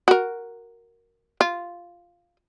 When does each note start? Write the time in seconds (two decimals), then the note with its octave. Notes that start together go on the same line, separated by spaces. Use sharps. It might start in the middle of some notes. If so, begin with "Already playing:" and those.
0.08 F#4 A#4
1.41 F4